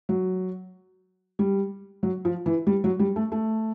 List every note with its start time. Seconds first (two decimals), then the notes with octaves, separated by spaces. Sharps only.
0.09 F#3
1.39 G3
2.03 F#3
2.25 F3
2.46 E3
2.67 G3
2.84 F#3
2.99 G3
3.16 A3
3.32 A3